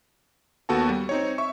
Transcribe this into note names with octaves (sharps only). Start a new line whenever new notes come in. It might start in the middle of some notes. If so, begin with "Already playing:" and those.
D#2 B3 F#4 A4 A5
G3
C4 D#4 C#5
E5 C#6